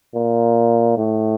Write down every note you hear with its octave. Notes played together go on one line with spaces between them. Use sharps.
A#2
A2